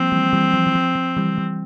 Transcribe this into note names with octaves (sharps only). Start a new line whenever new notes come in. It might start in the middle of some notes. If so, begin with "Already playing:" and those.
Already playing: F3 G3 A#3 C4
E3 G3
E3 G3
F3
E3
F3
F3
E3 G3
E3 G3